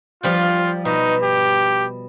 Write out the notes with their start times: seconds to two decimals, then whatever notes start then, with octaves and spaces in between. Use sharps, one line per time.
0.23 F3 G3 F4 G5
0.85 B2 D#4
1.23 G4